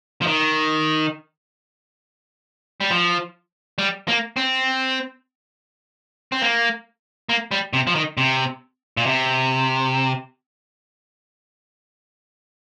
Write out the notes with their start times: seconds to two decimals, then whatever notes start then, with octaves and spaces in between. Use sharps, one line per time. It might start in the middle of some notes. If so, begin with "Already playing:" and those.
0.22 F3
0.27 D#3
2.81 G3
2.90 F3
3.78 G3
4.08 A#3
4.37 C4
6.32 C4
6.42 A#3
7.29 A#3
7.51 G3
7.73 C3
7.87 F3
7.95 D#3
8.17 C3
8.97 A#2
9.06 C3